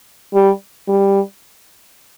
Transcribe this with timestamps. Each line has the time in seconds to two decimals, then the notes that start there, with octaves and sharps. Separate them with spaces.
0.34 G3
0.88 G3